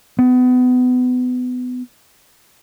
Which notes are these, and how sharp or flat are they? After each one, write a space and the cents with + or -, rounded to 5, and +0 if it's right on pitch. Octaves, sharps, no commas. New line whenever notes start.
B3 +25